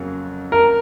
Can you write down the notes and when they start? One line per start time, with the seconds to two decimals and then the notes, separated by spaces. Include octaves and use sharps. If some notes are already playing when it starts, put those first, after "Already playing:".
Already playing: F2 C#3 F#3 A#3
0.52 A#4